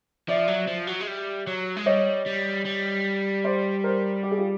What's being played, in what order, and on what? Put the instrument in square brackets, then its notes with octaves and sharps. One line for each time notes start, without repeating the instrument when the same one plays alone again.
[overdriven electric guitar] F3 [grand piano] D5 E5
[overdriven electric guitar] F#3
F3
F#3
G#3
G3
F#3
G#3
[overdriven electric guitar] G3 [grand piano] C#5 D#5
[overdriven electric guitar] G3
G3
[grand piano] C5 D5
A#4 C5
G4
G#4
F4 G4